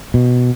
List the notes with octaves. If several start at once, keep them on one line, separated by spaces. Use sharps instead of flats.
B2